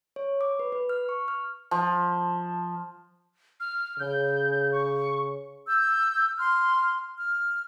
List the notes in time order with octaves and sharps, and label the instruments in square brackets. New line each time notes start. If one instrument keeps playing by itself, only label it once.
[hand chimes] C#5
D6
B4
B4
F6
C#6
F6
[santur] F3
[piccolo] F6
[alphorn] C#3 [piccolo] G6
[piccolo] C#6
[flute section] E6 G6
C6 F6
F6